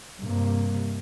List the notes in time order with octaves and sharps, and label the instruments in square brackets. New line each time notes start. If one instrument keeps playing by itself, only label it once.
[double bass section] G2 C3 A#3